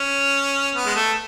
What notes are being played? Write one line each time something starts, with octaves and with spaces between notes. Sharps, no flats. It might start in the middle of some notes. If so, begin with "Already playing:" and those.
Already playing: C#4
B3
G#3
A3